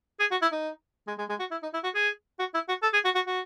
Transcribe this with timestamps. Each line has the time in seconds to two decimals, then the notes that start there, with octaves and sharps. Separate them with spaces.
0.20 G#4
0.31 F#4
0.42 E4
0.52 D#4
1.07 G#3
1.18 G#3
1.29 G#3
1.40 F#4
1.51 E4
1.63 D#4
1.73 E4
1.84 F#4
1.95 G#4
2.39 F#4
2.54 E4
2.68 F#4
2.82 A4
2.93 G#4
3.05 F#4
3.15 F#4
3.27 F#4